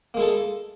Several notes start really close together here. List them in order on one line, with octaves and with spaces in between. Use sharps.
A#3 G#3 E4 A4